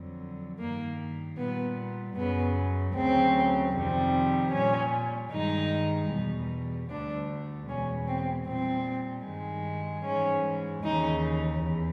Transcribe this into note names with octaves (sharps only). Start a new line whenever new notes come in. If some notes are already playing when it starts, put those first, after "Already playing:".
Already playing: F2 D3 F#3
G2 D#3 G3 A#3
A#2 G3 B3
F#2 C#3 F#3 B3
D2 C#3 F#3 C4
F2 C3 D#3 G3
A#2 G3 C#4
G2 D#3 G#3 D#4
E2 B2 G3
D2 D3 G3 D4
E2 B2 G#3 C#4
C4
A#2 G3 C4
G2 D#3 G#3
G#2 E3 G#3 C#4
D#2 C#3 E3 D#4
E2